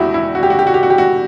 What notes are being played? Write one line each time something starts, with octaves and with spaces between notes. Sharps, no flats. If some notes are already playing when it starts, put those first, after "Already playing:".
Already playing: E2 E4 F#4 G4
E4
F#4
G4
F#4
G4
F#4
G4
F#4
G4
F#4